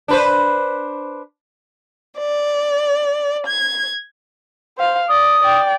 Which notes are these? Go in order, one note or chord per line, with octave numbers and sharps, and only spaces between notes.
D4 B4 C5
D5
G#6
C5 F5
D5 D#6
D5 G5